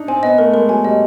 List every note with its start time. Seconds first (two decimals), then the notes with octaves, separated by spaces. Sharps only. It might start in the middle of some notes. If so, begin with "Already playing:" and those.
Already playing: D4 D#4
0.08 C4 G#5
0.23 B3 D#5
0.38 A3 A#4
0.54 G#3 A#4
0.69 F#3 G#5
0.85 G3 D#5